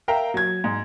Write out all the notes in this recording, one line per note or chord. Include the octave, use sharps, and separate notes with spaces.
A#4 E5 F5 G5 A#5
F#3 G#6
G#2